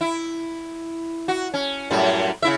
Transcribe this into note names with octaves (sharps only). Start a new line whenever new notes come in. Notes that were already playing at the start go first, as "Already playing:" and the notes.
E4
F#4
C#4
F#2 A2 G3
C#3 E4 E5